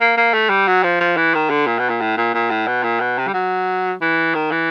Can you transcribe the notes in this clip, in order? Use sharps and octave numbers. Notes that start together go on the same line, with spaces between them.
A#3
A#3
A3
G3
F#3
F3
F3
E3
D#3
D3
A#2
B2
A#2
A2
A#2
A#2
A2
B2
A#2
B2
C3
G3
F#3
E3
D#3
E3